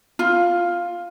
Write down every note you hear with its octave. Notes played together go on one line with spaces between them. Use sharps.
F4